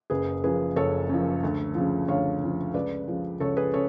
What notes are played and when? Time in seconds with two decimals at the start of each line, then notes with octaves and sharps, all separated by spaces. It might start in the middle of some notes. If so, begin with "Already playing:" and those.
0.10 F#1 G#4 B4
0.44 F#2 F3 G#4 B4
0.76 F#1 A4 C#5
1.09 F#2 F3
1.43 D2
1.75 C#3 F3
2.08 D2 C#5 F5
2.41 C#3 F3
2.74 C#2 B4 D5
3.08 C#3 F3
3.40 C#2 A4 C#5
3.57 G#4 B4
3.73 C#3 A4 C#5